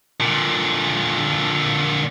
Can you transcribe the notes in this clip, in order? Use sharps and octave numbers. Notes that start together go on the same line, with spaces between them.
A#2 D3